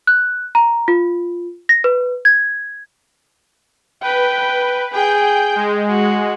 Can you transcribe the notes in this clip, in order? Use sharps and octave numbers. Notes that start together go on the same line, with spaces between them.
F#6
A#5
F4
A#6
B4
G#6
B4 G5
G#4 G5 G6
G#3
F#4